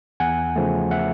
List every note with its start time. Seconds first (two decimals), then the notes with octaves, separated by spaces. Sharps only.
0.20 E2 F#5 G#5
0.56 C#3 F3 A3
0.91 E5 F#5